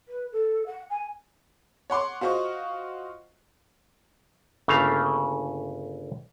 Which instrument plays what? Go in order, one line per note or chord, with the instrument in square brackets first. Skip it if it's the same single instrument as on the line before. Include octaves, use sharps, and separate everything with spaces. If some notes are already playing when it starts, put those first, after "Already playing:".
[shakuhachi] B4
A4
F#5
G#5
[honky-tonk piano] C#5 F#5 C6 D6
F4 F#4 C5 D#5 C#6
[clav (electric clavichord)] G1 C#3 A3 A#3 F5